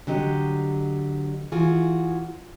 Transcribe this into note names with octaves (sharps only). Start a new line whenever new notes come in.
D3 F#3 G4 D#5
E3 F4 F#4 G#4